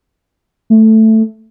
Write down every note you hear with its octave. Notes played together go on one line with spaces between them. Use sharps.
A3